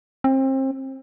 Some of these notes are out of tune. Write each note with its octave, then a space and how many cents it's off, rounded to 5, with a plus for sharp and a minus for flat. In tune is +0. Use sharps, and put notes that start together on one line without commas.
C4 +30